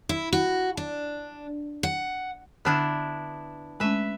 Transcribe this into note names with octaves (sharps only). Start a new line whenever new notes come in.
E4
F#4
D4
F#5
D3 B3 D4 E4 F6
G#3 A3 C#4 B4 E5